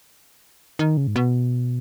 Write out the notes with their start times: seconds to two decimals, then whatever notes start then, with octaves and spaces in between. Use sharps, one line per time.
0.79 D#3
0.97 C#3
1.07 G#2
1.16 B2